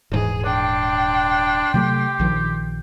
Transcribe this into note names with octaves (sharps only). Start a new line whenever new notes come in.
D#1 G#2 E3 G#4
D4 G5 C6
C3 F#3 A3 G4
A#1 D#3 F3